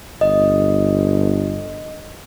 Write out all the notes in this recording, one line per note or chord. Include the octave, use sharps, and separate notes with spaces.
G1 D#5